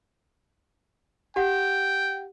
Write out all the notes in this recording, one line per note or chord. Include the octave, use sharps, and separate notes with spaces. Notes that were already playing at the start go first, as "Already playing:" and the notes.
G4 F#5 G5